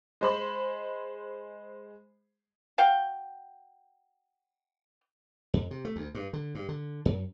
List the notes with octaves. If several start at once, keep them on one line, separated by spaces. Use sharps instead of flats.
G#3 C5 B5
F#4 F5 G5
F2
C3
A3
D2
G2
D3
G2
D3
F#2